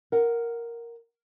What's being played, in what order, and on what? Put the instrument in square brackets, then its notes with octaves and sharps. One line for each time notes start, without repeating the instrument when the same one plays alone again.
[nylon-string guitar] A#4 F#5